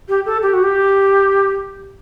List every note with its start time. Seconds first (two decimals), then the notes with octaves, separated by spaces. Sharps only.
0.09 G4
0.26 A4
0.42 G4
0.53 F#4
0.63 G4